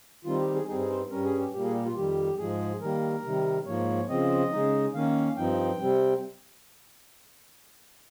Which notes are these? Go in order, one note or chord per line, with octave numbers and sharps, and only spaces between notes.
D#3 G3 C4 D#4 F4
G4
G#4
G2 G3 C4 D#4 G#4
G#4
C5
G2 G3 C#4 A#4
G#4
G4
A#2 G3 A#3 G4
G#4
G4
F4
F2 D#3 G3 G4
G#2 F3 G#3 G#4
D#3 G3 A#3 A#4
C3 D#3 G3
G#2 F3 A#3 C#5
C#3 F3 C4 D#5
C#3 G#3 D#4
D#3 A#3 C#4 F5
G2 F3 C4 D#4 G5
C3 G3 C4